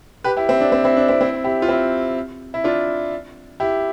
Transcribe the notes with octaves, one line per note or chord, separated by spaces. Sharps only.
G4 B4
E4 G4
C4 E4
D4
C4
C4 E4
D4
C4 E4
C4 E4
E4 G4
F4
C4 E4
E4
D4 F4
E4 G4